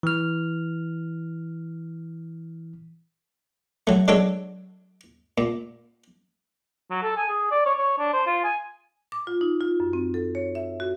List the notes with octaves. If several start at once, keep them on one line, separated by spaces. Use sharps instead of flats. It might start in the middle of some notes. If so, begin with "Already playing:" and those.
E3 F6
F#3 A3
F#3 G#3 D4 A4 C#5
A#2
F#3
A4
G#5
G#4
D5
C#5
C#5
D4
C5
F4
G#5
D6
F4
D#4
F4
F#2
C4
A4
C#5
E5
F#4